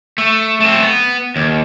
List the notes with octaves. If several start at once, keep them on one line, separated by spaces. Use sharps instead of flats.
A3
A3 C4
B3
D#2